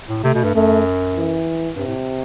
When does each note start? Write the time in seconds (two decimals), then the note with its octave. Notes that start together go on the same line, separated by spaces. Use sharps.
0.09 A2
0.23 C3 A3
0.35 B2
0.44 G2
0.54 F#2 A3
1.16 E3
1.76 G2 C3
1.87 A2